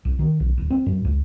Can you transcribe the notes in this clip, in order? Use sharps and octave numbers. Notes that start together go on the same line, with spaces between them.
C2
D#3
B1
D1
C4
F#2
C#2